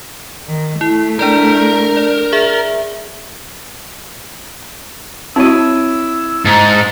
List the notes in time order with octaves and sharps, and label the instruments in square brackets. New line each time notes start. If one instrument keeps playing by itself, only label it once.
[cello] D#3
[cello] A3 [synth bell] E4
[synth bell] D4 D5 G6 [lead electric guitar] A#4
[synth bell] D5
G#4 E5
[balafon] C4 F#4 [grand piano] E4 C#5 [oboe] E6
[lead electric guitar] G#2 [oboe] A5